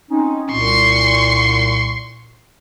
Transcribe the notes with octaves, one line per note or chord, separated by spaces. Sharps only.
C4 C#4 D#4
C2 A#2 C6 C#6